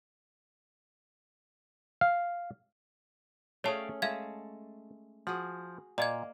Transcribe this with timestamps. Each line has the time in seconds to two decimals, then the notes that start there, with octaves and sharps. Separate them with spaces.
2.01 F5
3.64 A3 C#4 G#4 C#5 D5 F5 G5 A5
4.02 G#3 A3 E5 F5 A5 G#6
5.27 F3 F#4 G#4
5.98 A#2 A#3 D5 D#5 G#6